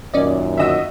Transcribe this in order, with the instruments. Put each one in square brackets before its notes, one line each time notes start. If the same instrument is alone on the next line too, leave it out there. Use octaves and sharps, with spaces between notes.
[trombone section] F#2 A#2 D#3 [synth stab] C#4 D5 D#5
[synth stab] D3 E6 [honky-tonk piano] F#4 D#5 E5